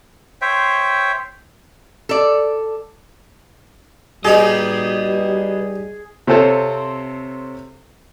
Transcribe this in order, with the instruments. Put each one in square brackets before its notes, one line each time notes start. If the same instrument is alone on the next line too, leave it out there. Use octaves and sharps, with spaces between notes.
[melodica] C5 C#5 E5 G5
[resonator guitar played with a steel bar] A4 D5
[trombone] G3 [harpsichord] D#4 G4 [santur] G#4 [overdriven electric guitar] B4 D#5
[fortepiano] C3 C4 F4 A4 C5 C#5